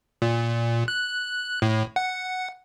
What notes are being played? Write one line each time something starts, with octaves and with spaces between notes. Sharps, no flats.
A#2
F#6
A2
F#5